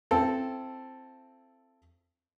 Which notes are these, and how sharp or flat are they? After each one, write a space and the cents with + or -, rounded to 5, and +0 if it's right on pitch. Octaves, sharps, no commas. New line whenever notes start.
C4 +0 E4 +45 A4 +0